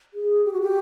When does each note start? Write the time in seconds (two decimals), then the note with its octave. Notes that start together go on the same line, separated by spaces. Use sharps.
0.14 G#4
0.45 G4
0.53 F#4
0.61 G4